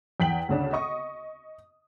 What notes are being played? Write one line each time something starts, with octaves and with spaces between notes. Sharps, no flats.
E2 G5 B6 F#7
D2 C#3 D4
D#5 C#6 D#6